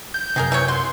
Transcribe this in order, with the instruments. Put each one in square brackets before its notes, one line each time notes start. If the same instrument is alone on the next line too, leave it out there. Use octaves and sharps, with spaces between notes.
[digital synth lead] G6
[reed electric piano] F#2 C3 [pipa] F#3 G#4 A#4
[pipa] E3 F#3 C#5
[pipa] F#4 [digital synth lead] C6